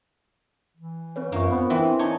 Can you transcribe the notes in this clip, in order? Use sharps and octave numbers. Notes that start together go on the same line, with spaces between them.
E3
C4 B4 C#5
F#2 A#3 D4 F4 C#6
B3 C5
E3 C4 E5
D4 D#4 C#5 G#5